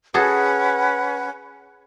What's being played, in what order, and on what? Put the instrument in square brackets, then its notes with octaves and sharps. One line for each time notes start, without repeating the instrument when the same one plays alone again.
[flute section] C#4 B4 F#5 [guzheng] F#4 G#4 A4